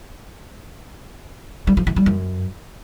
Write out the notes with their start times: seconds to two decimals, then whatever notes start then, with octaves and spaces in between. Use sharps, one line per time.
1.67 G3
1.77 F3
1.87 E3
1.96 G3
2.06 F#2